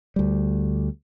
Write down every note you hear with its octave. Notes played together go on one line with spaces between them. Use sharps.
D2 G3